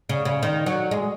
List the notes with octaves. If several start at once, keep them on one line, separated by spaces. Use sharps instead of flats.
C#3
C#3
D#3
F#3
G#3